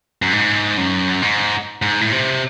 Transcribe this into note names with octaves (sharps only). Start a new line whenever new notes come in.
F#2
G#2
F#2
G#2
G#2
A2
C3